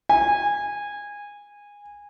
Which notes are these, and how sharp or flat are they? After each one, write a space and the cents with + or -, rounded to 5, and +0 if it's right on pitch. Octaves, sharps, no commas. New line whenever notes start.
G#5 -20